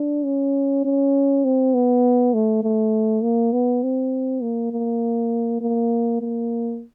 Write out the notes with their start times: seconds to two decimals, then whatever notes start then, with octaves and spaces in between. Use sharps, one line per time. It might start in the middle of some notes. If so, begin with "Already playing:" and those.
Already playing: D4
0.25 C#4
0.85 C#4
1.45 C4
1.74 B3
2.34 A3
2.63 A3
3.23 A#3
3.53 B3
3.83 C4
4.42 A#3
4.72 A#3
5.61 A#3
6.21 A#3